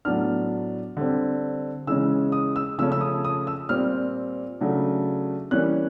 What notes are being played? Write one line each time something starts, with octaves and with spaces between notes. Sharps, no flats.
A2 F#3 B3 D4 F6
D3 G3 C4
C#3 E3 G#3 C#4 E6
D#6
E6
C#3 F3 A3 C#4 E6
E6
D#6
D#6
E6
A#2 G3 C4 F6
C#3 F#3 A3 D4
E3 G3 A#3 C#4 F#6